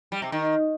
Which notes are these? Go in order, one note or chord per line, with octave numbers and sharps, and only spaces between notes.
G3
C3
D#3